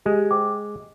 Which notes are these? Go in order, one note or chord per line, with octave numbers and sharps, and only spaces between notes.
G#3 G4
C5 G5 D6